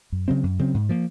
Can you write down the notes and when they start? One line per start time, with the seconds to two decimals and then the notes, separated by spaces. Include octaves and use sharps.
0.12 F#2
0.28 C#3 F#3 C4
0.43 F#2
0.59 C#3 F#3 C4
0.74 G#2
0.89 F3 A#3